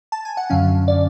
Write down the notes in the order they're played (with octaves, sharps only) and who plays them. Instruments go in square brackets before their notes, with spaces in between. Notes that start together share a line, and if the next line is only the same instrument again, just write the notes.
[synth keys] A5
G#5
F#5
F#2 D3 F#3 C#4 F5
D5